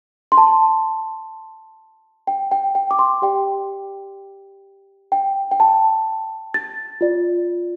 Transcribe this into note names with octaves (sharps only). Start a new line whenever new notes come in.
C6
A5
G5
G5
G5
D6
C6
G4 D5 G5
G5
G5
A5
A6
F4 D5